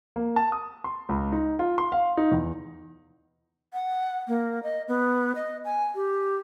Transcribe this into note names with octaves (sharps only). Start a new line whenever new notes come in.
A#3
A5
D#6
C6
C#2
D#4
F4
C6
F5
D#4
E2
F#5
A#3
D#5
B3
D#5
G#5
G4